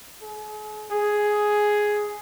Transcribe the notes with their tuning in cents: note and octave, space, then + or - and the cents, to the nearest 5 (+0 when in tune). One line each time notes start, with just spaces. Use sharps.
G#4 +40
G#4 +5